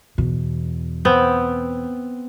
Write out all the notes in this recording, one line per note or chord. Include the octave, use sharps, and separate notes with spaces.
E2 B2
B3 C4 G5